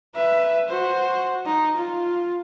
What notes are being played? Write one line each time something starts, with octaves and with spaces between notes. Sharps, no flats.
B4 E5
F#4 C5
D#4
F4